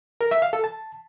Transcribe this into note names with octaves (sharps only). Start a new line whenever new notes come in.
A#4
E5
F5
A4
A5